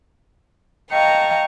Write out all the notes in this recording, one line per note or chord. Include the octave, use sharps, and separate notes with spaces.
D#5 F5 G5 A5 A#5 C#6